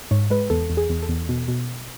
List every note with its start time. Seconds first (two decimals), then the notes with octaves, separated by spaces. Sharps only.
0.11 G#2 C#5
0.30 G#3 B4
0.50 E2 A4
0.70 E2
0.77 G#4
0.90 E2
1.03 A4
1.09 E2
1.29 B2
1.48 B2